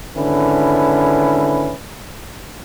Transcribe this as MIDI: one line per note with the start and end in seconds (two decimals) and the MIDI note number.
0.16 1.75 32
0.16 1.75 50
0.16 1.75 61
0.16 1.75 64
0.16 1.75 71